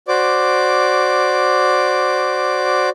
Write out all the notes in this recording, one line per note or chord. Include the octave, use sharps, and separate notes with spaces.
F#4 C5 D5 D6